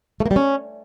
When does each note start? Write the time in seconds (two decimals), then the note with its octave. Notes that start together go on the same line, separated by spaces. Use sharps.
0.20 A3
0.26 A#3
0.31 G3
0.36 C#4